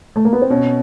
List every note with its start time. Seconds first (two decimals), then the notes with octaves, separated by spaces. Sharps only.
0.16 A3
0.25 A#3
0.33 B3
0.42 C4
0.50 B2 C#4